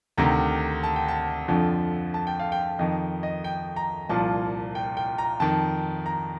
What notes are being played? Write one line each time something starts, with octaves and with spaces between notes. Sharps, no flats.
D2 C3 D#3 A#5
A5
G5
A5
F2 D3 F3
A5
G5
F5
G5
F2 D#3 D#5
D#5
G5
A#5
C2 A#2 F3 A5
G5
G5
A#5
F2 D#3 A5
A#5